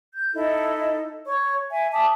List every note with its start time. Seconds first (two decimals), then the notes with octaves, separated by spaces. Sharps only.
0.15 G6
0.34 D#4 E4 A4 D#5
1.26 C#5 C#6
1.71 E5 G#5
1.93 E5 A5 D6 D#6